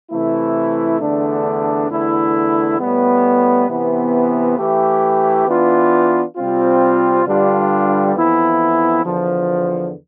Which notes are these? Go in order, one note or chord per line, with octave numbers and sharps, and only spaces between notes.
C3 E3 A3 E4
E2 D3 A3 D4
E2 D3 A3 E4
A2 G3 B3
C3 E3 B3
E3 A3 E4 G4
E3 B3 D4 F4
C3 G3 C4 F4
G2 D3 G3 D4 F4
F2 E3 B3 E4
E2 D3 F3